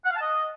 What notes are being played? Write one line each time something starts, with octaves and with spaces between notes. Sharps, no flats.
F#5
F5
A5
D#5